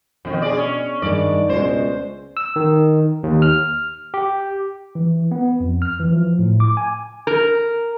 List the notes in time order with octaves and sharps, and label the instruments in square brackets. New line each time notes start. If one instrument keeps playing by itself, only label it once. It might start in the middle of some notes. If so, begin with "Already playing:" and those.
[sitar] F2 D#3 [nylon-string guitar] B2
[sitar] G#4 D5
C#4
[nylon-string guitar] G2 G#3 [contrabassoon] D#3 [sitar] D5
[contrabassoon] C#2 [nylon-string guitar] B2 G#3 [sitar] C5
[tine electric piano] E6
D#3
D#2
F6
G4
E3
B3
F2
F6
E3
F3
A2
D6
G#5
[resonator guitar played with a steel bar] A#4